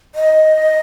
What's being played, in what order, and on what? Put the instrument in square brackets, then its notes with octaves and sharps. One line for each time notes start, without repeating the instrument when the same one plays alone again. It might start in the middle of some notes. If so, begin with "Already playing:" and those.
[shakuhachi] D#5